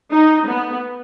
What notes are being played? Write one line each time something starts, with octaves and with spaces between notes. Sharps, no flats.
D#4
B3